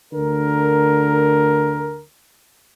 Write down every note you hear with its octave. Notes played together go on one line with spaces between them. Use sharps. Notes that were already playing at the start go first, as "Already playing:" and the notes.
D2 D3 A#4